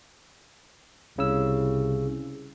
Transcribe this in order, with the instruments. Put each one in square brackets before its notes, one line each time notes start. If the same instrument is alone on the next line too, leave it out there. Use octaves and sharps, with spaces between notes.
[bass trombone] C2 [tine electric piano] C#3 E6